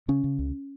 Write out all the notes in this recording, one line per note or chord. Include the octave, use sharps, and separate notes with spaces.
C#3 C#4
C#3
C#2